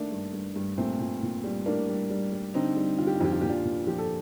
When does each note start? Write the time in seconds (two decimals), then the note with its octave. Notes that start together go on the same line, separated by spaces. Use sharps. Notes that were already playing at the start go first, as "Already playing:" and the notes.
Already playing: D#3 A3 A#3 D4
0.11 G2
0.33 G2
0.56 G2
0.77 A#2 A3 C4
0.99 A#2
1.22 A#2
1.44 G3
1.66 A2 A#3 D4
1.88 G3
2.10 G3
2.32 G3
2.54 D3 C4 D#4
2.77 G3
2.98 D3 F4
3.07 G4
3.16 F4
3.21 F2 G4
3.33 F4
3.41 A#2 G4
3.49 D4 F4
3.64 A#2
3.87 F3 G4
3.98 A4